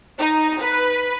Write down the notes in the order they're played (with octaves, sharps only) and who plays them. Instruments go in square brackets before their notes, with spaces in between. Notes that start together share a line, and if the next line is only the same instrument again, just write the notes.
[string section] D#4
B4